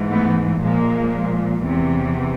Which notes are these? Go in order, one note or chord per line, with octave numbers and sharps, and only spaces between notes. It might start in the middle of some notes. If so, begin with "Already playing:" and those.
Already playing: G#2 E3
A3 B3
A#2 F3 G#3 A#3
E2 C3 E3